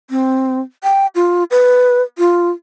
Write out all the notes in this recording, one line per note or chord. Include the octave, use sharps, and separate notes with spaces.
C4
G5
F4
B4
F4